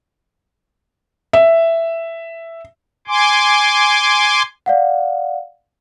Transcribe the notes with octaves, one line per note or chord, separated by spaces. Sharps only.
E5
G#5 C6 D6
D5 F5 F#5